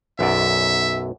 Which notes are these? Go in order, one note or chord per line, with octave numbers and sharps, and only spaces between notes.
B1 F#2 D5 E5